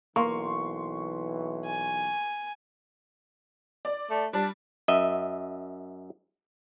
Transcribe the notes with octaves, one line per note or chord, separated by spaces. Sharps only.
B1 E3 A#3 C6 C#6
G#5
D5
A3
G3 D4
F#2 D#5 E5